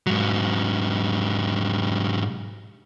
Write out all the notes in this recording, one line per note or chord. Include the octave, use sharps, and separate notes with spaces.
G#2 F#3